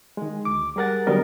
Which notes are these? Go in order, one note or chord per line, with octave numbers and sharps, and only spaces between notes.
D#3 G#3
D2 D6
G3 G#4 A#4 F#5 A6
D3 F#3 G3 B3 A#4 D#5